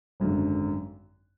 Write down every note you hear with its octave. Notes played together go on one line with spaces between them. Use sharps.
G#1 F#2 D3